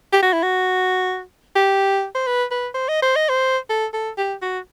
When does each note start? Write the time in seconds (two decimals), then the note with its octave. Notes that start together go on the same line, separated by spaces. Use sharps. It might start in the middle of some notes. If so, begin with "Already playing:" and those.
0.13 G4
0.22 F#4
0.33 E4
0.43 F#4
1.56 G4
2.15 C5
2.27 B4
2.51 B4
2.75 C5
2.89 D#5
3.02 C5
3.16 D#5
3.29 C5
3.70 A4
3.94 A4
4.18 G4
4.42 F#4